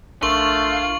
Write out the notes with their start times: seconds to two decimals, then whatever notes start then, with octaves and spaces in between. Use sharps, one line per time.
0.23 A#1 A3 D4 F4 A#4 C#6 F#7